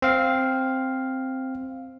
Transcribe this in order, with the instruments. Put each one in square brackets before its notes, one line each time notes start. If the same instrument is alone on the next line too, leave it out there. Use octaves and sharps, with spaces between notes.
[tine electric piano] C4 F5